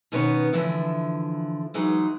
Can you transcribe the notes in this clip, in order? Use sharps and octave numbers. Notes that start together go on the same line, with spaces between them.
B2 D#3 B3 C#4 B4 C#5
D3 E3 F3 E4
E3 F#3 G#3 D#4